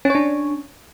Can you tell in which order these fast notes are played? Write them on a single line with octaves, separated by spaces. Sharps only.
C#4 C#5 D4